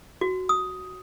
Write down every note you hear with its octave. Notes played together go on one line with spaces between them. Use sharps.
F#4
D#6